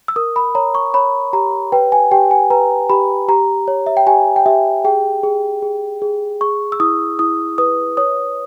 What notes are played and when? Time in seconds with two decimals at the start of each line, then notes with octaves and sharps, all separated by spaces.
0.08 E6
0.16 A#4 D#6
0.36 B5
0.55 C#5 A#5
0.75 C#6
0.94 C#5 B5
1.33 G4 A#5
1.72 B4 G5
1.92 G#5
2.12 G4 G5
2.31 G#5
2.50 B4 A#5
2.90 G4 B5
3.28 G4 A#5
3.68 C#5
3.87 E5
3.97 G5
4.07 G4 G#5
4.36 G5
4.46 G4 E5
4.85 G#4 G5
5.23 G#4
5.63 G#4
6.02 G#4
6.41 G#4 C#6
6.72 E6
6.80 E4 D#6
7.19 E4 D#6
7.58 B4 D#6
7.97 C#5 D#6